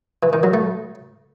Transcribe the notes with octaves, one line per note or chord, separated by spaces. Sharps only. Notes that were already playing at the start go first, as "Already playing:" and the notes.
E3
D#3
F#3
A3